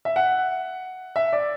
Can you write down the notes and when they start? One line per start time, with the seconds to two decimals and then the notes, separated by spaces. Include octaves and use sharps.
0.05 E5
0.16 F#5
1.16 E5
1.33 D5